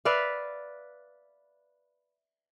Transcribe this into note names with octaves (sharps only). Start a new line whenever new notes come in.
B4 D5 E5 F5